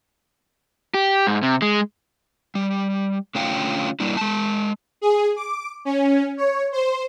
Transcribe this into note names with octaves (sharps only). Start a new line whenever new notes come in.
G4
G#2
C3
G#3
G3
D3 A3 C#4 F4 F5 G5
G3 A#3 D4 E4
G#3 A5
G#4
D6
C#4
C#5
C5